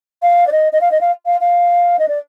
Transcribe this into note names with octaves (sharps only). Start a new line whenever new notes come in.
F5
D5
D#5
D#5
F5
D#5
F5
F5
F5
D#5
D5